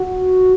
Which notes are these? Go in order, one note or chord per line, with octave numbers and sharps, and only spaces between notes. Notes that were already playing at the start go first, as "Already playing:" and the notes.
Already playing: F#4